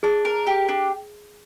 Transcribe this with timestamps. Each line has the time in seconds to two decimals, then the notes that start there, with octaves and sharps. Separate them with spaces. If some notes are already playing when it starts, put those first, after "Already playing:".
0.03 D4 G#4
0.25 A#4
0.47 G4
0.69 D4